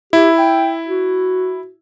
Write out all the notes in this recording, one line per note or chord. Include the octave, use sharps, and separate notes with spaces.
E4 G4
G5
F#4